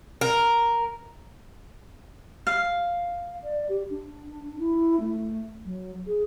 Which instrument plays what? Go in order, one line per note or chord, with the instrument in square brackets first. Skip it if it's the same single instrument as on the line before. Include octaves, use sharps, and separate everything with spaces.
[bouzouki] A#4
[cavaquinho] F5
[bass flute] D5
G4
D4
E4
A3
F#3
G#4